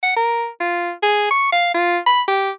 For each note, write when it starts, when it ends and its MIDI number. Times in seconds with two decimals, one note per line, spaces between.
0.03 0.15 78
0.16 0.48 70
0.61 0.92 65
1.02 1.30 68
1.31 1.51 85
1.52 1.74 77
1.75 1.98 65
2.06 2.22 83
2.28 2.50 67